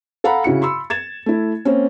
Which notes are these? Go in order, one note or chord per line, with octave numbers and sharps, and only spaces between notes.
A4 F5 F#5 A#5 B5
C#3 E4 F#4 C#7
B5 C6 E6
G#6 A6 E7
A3 E4
A#3 C4 C#4